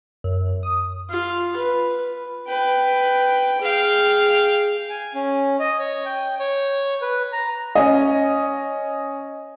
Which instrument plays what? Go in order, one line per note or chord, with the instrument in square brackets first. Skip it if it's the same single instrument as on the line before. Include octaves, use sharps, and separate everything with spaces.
[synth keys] F#2
D#6
[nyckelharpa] F4
B4
[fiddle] B4 [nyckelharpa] G5
[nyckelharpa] G#4 [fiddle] F5 G5
[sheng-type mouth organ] G#5
C#4
D#5
C#5
G5
C#5
B4
A#5
[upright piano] C#4 D#5